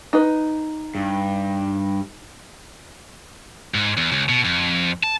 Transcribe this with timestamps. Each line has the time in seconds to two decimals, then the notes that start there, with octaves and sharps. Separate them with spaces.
0.13 D#4 B4
0.95 G2
3.74 G#2
3.97 E2
4.12 C#2
4.29 B2
4.45 F2
5.03 A5